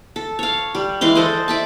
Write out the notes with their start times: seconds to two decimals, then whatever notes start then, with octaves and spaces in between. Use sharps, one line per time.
0.16 A4
0.39 C#5 F5
0.75 G3
1.01 E3 G#3 F5 C6
1.15 A4 C5 D5 D#5
1.48 D5 E5 A5